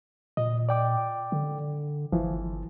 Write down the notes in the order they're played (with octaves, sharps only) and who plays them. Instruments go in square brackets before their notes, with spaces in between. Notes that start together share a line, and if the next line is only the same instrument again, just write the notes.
[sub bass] A#2 [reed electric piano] D#5
[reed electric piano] D5 G5 D6
[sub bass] D3
[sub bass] G1 [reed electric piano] E3 F3